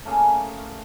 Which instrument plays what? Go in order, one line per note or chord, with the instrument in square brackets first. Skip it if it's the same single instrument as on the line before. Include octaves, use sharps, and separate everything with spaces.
[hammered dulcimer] A3 A#3 C#4 G#4